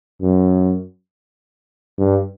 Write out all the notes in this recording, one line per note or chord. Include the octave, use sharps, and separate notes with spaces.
F#2
G2